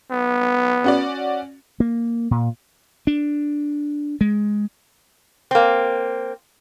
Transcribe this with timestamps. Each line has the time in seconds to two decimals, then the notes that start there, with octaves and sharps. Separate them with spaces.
0.11 B3
0.84 C#4 F#4 D5
1.80 A#3
2.31 A#2
3.07 D4
4.21 G#3
5.51 A#3 C4